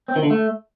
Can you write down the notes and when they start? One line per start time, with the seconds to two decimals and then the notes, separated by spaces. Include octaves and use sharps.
0.08 C4
0.16 D#3
0.23 D3
0.30 A3